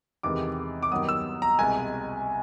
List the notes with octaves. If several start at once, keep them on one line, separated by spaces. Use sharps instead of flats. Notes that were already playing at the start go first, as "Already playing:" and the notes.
E2 C3 D#3 G#3 D6
D6
G2 D#3 F#3 B3 D#6
E6
A#5
C2 B2 G#3 G#5